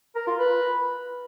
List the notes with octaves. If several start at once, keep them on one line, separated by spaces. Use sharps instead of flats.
A#4
F4
B4